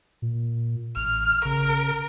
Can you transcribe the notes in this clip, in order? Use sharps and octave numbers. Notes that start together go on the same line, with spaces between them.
A#2
A1 F6
C#3 A#4